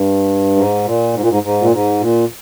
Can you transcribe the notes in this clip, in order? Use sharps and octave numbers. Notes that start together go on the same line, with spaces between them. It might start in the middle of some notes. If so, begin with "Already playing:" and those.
Already playing: G2
G#2
A#2
G#2
A#2
G#2
G#2
A#2
G#2
A#2